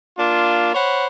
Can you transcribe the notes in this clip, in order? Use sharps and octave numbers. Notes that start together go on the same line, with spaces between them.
A#3 D4 F4
C5 C#5 F#5 B5